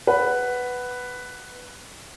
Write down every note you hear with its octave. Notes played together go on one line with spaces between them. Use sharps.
B4 F#5